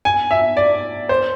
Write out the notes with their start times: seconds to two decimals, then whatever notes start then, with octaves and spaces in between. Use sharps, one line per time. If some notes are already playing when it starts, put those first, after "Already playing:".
0.05 G#5
0.31 E5
0.57 D5
1.09 C5